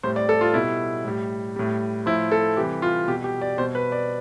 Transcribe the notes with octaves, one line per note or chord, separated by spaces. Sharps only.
A2 G3 C5
D5
A4
F4
B2 G3 E4
A2 G3
A2 G3
A2 F3 E4
A4
C3 E3 G3 G4
F4
B2 G3 G4
G4
D5
B2 G3 C5
B4
D5